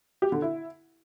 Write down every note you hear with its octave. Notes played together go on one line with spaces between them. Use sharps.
G4
D3
E4